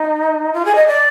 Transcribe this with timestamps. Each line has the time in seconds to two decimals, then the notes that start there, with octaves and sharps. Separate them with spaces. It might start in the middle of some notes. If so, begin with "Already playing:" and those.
Already playing: D#4
0.53 F4
0.65 G#4
0.75 D#5
0.87 D5